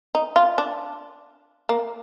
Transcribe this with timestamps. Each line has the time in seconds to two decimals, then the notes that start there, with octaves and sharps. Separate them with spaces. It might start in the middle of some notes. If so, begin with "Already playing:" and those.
0.15 D#4
0.36 F4
0.58 D4
1.69 A#3